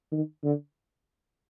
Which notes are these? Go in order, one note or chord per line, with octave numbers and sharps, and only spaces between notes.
D#3
D3